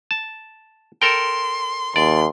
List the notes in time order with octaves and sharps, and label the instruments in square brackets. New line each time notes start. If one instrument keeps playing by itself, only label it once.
[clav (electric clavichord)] A5
[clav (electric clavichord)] A4 A#4 G5 [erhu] C6
[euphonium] D#2 [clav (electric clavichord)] D5 [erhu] C6